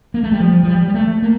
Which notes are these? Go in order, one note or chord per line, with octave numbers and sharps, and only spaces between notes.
A#3
A3
G3
F3
F3
G3
G3
A3
A#3